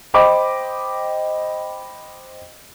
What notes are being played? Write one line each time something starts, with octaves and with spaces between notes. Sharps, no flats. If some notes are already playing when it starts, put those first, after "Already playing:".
C5 D#5 G5 B5 D6